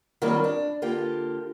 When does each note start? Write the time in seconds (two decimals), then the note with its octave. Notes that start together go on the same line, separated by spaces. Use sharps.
0.22 D#3 F#3 G3 A#3 C4 F4
0.44 D4
0.82 D3 A#3 F4 G4